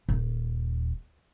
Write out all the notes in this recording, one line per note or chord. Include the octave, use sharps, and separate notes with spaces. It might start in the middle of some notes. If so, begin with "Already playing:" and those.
D#1